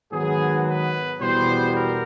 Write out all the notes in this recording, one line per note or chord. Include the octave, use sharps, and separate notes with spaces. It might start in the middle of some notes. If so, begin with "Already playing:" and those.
G#2 D#3 F#3 B3 G#4
B4
E2 B2 G3 B3 C5
A#4